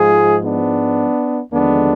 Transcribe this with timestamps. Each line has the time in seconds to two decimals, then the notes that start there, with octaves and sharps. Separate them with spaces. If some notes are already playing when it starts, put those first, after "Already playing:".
Already playing: G#2 F3 G#3 F4 G#4
0.43 B3 D4
1.52 D#2 D3 F3 G#3 B3 D4